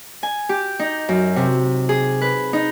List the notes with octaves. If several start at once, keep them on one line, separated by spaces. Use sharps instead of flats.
G#5
G4
D#4
F#2
C3
G#4
B4
D#4